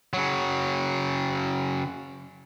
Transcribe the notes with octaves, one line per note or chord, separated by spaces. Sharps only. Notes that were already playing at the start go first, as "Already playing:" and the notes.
C#3 F#3